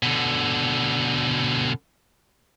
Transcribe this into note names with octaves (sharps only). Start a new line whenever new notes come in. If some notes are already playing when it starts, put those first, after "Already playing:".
B2 D3